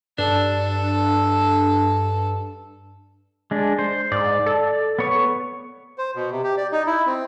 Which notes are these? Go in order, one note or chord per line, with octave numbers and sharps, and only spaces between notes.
G2 D4 A4
G#3 D4
C5
G#2 D5
A4
B3 C#5 C#6
C5
B2
C3
G4
D5
D#4
E4
C4